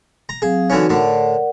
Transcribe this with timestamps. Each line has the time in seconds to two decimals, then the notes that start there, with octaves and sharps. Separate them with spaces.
0.29 A#5
0.42 F#3 C4 G#4 F5
0.70 D3 E3 C#4 D#4 F#4
0.90 A2 D3 A#4 D5 F#5